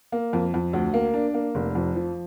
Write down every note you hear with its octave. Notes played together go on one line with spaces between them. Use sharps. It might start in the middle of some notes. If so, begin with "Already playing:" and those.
A#3
F2
F2
D2
A#3
D4
A#3
F1
F2
F3